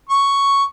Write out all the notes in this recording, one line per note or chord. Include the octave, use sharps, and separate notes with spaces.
C#6